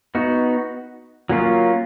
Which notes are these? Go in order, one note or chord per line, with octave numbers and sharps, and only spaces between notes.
B3 D#4 F#4
F#3 A#3 C#4 F4